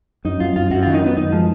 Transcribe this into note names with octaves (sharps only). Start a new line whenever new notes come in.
F#2 D#4
F#2 F4
F#2 F4
F#2 F#4
D#3 F4
D#4
D#3 B3
F#2 D#4
F3 G#3